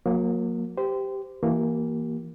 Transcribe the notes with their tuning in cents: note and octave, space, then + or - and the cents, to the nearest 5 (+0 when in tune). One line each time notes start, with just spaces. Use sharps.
F#3 -40 A#3 +0
G4 +0 C5 -25
E3 +0 A#3 +0 G4 -45